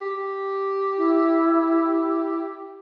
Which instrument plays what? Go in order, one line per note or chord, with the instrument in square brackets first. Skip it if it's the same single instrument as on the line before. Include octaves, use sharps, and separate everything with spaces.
[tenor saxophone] G4
[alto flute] E4